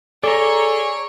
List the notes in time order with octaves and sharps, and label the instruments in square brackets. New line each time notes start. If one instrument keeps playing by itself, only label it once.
[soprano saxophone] G#4 [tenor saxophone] A4 [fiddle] C#5 [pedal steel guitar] D5 A#5